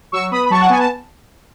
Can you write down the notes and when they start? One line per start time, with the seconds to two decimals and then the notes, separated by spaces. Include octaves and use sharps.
0.12 F#3 C#6 E6
0.31 B3 B5 D#6
0.46 B5
0.50 F#3 A5 C#6
0.60 F#5
0.69 B3 G#5
0.79 A5